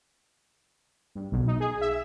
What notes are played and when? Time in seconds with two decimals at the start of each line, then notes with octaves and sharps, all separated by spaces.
1.15 G2
1.32 B1
1.48 D#4
1.60 G#4
1.81 E5